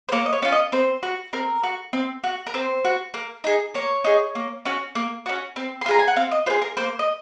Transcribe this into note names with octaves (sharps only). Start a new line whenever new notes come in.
C5
A#3 C#5
D#5
C#5
C#4 F4
D#5
C4 C5
F#4
C4 A#4
F#4
C4
F#4
A#4
C4 C5
F#4
A#3
D#4 G#4
A#3 C#5
D#4 G#4
A#3
C#4 F#4
A#3
C#4 F#4
C4
C6
F4 G#4 A#5
G#5
F#5
C4 F5
D#5
F4 G#4 C5
A#4
A#3 C5
D#5